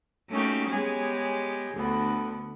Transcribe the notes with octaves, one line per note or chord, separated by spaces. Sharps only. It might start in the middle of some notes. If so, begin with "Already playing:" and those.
A3 A#3 C#4 D#4 F#4 G4
G#3 B3 G4 G#4 C#5
D2 D3 B3